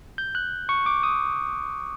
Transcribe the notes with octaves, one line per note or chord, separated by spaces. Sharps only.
G6
F#6
C#6
D6
D#6